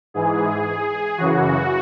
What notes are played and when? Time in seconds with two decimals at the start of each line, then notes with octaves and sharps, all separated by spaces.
0.14 G#2 E3 G#4
1.18 F#2 C#3 E3 F#4